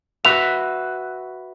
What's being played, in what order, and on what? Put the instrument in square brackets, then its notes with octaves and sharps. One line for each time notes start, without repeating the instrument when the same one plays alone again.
[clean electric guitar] F#4 B4 E5 [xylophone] F7